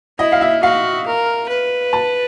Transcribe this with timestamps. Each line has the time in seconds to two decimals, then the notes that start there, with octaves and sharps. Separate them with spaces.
0.19 E4 D#5
0.32 F5
0.41 E5
0.63 F#4 F5
1.06 A#4
1.49 B4
1.93 A5